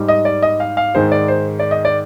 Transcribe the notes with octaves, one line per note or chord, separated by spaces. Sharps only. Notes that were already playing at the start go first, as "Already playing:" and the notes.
Already playing: G#2 G3
D#5
D5
D#5
F5
F5
G#2 D#3 G#3 C5
D5
C5
D5
D#5
D5